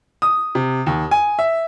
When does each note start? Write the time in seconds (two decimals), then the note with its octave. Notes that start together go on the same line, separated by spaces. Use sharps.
0.22 D#6
0.55 C3
0.87 D#2
1.11 G#5
1.39 E5